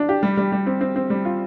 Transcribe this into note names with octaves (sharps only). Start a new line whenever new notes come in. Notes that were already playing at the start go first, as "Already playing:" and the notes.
Already playing: D4
G4
G3
G3
G3
C4
C4
C4
G3
F4